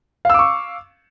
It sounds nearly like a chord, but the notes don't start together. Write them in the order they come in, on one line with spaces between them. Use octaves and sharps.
F5 E6 D6 C#6